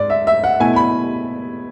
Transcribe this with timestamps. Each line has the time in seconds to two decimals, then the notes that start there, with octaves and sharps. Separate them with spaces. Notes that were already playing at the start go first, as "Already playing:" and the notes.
Already playing: G#2 D5
0.10 E5
0.27 E5
0.44 F#5
0.60 B2 A3 E4 G#5
0.76 B5